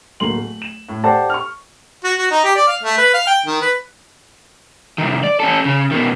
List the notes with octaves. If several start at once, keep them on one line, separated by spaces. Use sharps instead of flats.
D1 A3 A#3 C6 F#7
A3
E7
A2
G4 A4 C5 D5 F#5 A5
C#6 F6
F#4
F#4
D#4
G4
D5
F5
A3
B4
F5
G5
D#3
B4
C2 D#3
D5
C#4 A4
C#3
B2 D#3